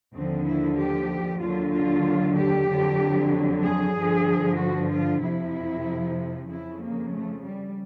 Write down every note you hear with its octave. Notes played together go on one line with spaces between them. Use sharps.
D#2 D3 F3 C4
E4
G4
D#2 D3 F#3 F4
F4
G4
F2 D3 F#3
G#4
G2 D3 F3
F#4
F4
F2 C3 F3 E4
F2 C#3 F3 E4
A#3
A3
G3